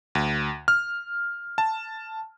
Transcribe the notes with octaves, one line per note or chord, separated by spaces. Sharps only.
D2
F6
A5